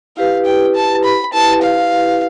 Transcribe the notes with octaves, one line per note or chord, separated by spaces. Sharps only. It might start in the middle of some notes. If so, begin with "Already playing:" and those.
E4 G4 B4 F5
G5
A5
B5
E4 G4 B4 A5
F5